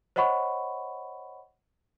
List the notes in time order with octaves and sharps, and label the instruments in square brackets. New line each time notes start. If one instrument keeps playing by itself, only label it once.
[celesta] C5 C#5 D#5 F#5 B5 C#6